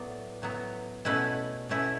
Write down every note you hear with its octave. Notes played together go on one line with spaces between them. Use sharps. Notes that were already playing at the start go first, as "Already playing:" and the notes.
Already playing: A2 F#3 B3 D5
A2 F#3 B3
B2 A3 C#4 E4 B4
B2 A3 C#4 E4